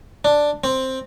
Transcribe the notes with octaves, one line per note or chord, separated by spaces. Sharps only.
D4
C4